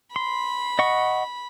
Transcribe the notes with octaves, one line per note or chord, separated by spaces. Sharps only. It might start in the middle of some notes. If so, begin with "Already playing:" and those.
B5 C6
D#5 F#5 C#6